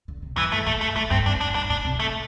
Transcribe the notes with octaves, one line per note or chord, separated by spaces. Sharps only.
D3
C3
G2 E3
A3
A2 A3
G2 A3
A2 A3
G2 C4
G2 D4
G2 D4
G2 D4
A2 D4
C3
A2
A3